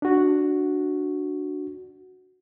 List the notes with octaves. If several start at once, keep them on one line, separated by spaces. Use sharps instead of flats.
D4 F#4